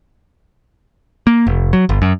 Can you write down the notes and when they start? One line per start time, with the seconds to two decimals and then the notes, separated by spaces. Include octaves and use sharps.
1.27 A#3
1.47 F1
1.73 F#3
1.89 G1
2.02 F#2